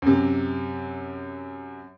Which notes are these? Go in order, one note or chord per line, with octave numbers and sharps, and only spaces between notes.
F#2 C3